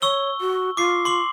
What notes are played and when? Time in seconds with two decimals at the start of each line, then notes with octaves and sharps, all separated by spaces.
0.02 C#5 C#6 E6 G7
0.41 F#4
0.77 F4 D6 C7
1.05 C6 D6 F#7